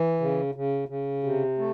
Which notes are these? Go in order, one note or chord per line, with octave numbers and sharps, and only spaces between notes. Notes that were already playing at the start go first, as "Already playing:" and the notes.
Already playing: E3
C#3
C#3
C#3
C3
A3